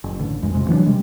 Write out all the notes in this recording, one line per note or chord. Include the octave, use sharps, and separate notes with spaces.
F#1
A1 D3
A#1 F2 G#3
F2 C3 G#3
E3 F#3 B3 D4
C3 G3 G#3